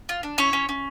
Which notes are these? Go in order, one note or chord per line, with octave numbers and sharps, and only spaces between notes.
F4
D4
C#4 E4 C#5
C#4
C#4